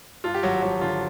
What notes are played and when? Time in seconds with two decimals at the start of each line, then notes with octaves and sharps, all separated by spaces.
0.24 G2 F4
0.34 G4
0.43 G#1 F#3 F#4
0.62 F3 F#3 F#4
0.81 D3 F4